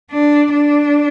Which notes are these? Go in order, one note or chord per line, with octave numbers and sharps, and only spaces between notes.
D4
D4